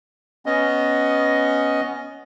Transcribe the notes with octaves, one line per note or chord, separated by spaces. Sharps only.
B3 C#4 D#5